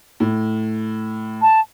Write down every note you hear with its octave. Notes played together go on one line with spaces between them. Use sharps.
A2
A5